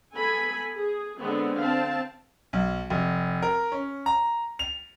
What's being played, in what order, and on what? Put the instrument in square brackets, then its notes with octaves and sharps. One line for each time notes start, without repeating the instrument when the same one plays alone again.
[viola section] B3 A4 G#5 B5
G#4
D3 G#3 B3 C4
C4 F5 A5
[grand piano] B1
F1
A#4
C#4
A#5
F7